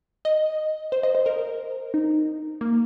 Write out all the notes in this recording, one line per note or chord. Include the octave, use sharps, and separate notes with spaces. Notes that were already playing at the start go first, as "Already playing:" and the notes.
D#5
C5
D#5
C5
A#4
D#4
A#3